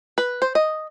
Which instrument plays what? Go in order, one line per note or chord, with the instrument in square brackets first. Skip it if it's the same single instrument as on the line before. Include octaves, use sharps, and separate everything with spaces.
[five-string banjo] B4
C5
D#5